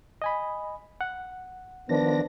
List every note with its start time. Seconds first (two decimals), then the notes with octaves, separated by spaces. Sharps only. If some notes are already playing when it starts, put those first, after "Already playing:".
0.22 D#5 G#5 B5
1.01 F#5
1.89 D#3 F3 B3 D4 A#6